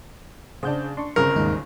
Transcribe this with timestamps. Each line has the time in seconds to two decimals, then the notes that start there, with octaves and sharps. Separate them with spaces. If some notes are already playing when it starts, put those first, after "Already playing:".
0.63 C#3 D4 C5 F#5 G6
0.97 D4 C6 C#6
1.16 G1 C#3 C4 A#4
1.35 D#2 G#2 D#4